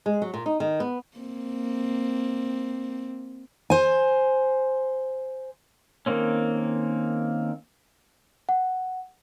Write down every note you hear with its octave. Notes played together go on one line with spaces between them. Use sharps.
G#3
F#3
A#2
D#4
D#3
B3
A#3 C4
C5 G#5
D#3 A#3 C4 C#4
F#5